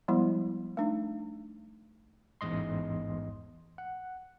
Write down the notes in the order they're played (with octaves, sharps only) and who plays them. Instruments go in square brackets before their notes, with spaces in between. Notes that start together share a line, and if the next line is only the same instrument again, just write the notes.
[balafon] F3 G3 G#3 B3 E4
A3 D4 D#4
[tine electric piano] A1 E2 G#2 D#5 C6
F#5